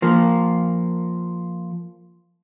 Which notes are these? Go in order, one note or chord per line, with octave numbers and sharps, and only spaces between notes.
F3 A#3